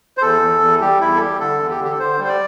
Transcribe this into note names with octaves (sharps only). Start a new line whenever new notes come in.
C5
E2 A4
E2
E2
G3 G4
E2 E4
A4
G3 G4
D3 A4
E2
G4
D3
G4
A4
D3 C5
G3
C5
D5